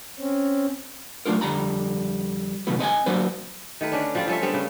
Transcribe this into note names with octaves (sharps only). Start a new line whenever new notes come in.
C4 C#4
F#3 A3 D4 F4 A#4
F2 D3 G3 A#5 B5
F2 A2 C3 D#3 F#3 B3
C4 D#5 G5 G#5
F#3 A#3 D4 F#4 B4 C5
D#3 A3 B4
D3 C#4 D4
F3 G3 C4 F4
F3 C#4 A4 E5
D3 G3 B3 C4
C#3